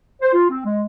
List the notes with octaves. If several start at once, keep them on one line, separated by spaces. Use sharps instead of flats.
C5
F4
C4
G#3